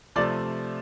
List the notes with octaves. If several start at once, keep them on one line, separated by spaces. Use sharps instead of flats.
C3 F3 A3 D5